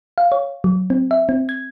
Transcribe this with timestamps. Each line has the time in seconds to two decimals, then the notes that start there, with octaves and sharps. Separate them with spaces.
0.18 F5
0.32 C#5
0.64 F#3
0.90 C4
1.11 E5
1.29 C4
1.49 G#6